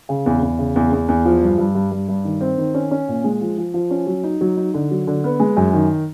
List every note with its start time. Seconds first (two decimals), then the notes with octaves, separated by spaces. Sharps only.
0.09 C#3
0.26 E2
0.42 E2
0.59 C#3
0.76 E2
0.92 E2
1.08 E2
1.25 F3
1.42 G2
1.58 G2
1.75 G2
1.92 G2
2.09 G2
2.24 D#3
2.41 C4
2.58 D#3
2.74 C#4
2.91 C#4
3.08 A#2
3.24 G#3
3.41 F3
3.58 F3
3.74 F3
3.91 C#4
4.07 F#3
4.24 D#4
4.41 F#3
4.57 D#4
4.74 D3
4.91 F#3
5.07 D3
5.24 B3
5.40 G#3
5.57 F#2
5.73 D#3